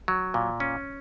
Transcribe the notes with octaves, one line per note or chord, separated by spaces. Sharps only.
F#3
A#2
C#4